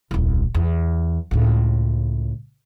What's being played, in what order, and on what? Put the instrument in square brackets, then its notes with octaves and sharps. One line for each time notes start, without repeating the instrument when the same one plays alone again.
[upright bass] D#1 C2
E2
C#2 A2